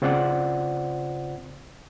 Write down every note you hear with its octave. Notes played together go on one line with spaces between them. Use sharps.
C#3 C4 F4 C5 D5 F#5